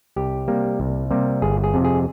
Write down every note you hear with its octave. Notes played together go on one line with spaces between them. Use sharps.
C2 G4
C3 G3 A#3
C2
C3 G3 A#3
G1 G#4
G#4
F2 C3
G#4